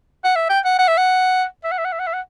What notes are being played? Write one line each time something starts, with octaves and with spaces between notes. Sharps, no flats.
F#5
E5
G5
F#5
F#5
E5
F#5
E5
F#5
E5
F#5
E5
F#5
E5
F#5